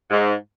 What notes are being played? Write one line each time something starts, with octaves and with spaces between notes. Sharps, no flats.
G#2